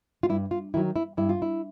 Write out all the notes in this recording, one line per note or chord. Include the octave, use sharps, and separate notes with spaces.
F4
G2 E4
F4
D#3 F#3 E4
E4
G2 E4
F4
E4